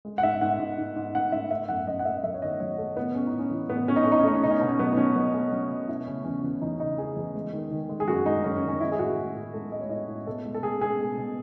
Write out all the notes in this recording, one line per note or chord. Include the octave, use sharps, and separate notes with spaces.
G#3
F#5
G#2 E5
G#2 F#5
G#2
G#2
G#2
G#2 F#5
G#2 E5
A3 E5
F#2 F#5
F#2 D#5
F#5
A3 E5
F#2 E5
C#5
D#3 D#5
F#3 C#5
A3 A4
A2 B3
A3 C#4
D#4
A2
C#4
E3
A2 B3
A2 C#4
D#4
A3 C#4
D#4
C#4
A3 D#4
C#4
B2 D#4
C#4
B2 D#4
C#4
F#3 B3
D#4
F#3 C#4
F#3 B3
A3 C#4
F#3 C#4
B2
A3 E4
C#3 C#4
E2 C#4
E2 C#4
E2 D#4
C#3 D#4
E3 G#4
E2
G#3
D#3
D#3
G#3
G#4
F#2 F#4
G#3 D#4
F#2 C#4
C#4
D#3
C#4
G#3 E4
G#4
A2 F#4
A2
A2
G#3 A4
G#3 D#5
C#5
A2 D#5
A2
B2 A4
G#3
A4
B2 G#4
B2 G#4
G#3
B2